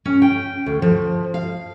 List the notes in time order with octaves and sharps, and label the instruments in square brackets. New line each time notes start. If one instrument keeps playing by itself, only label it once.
[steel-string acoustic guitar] C#4
G5
D2
F3
F5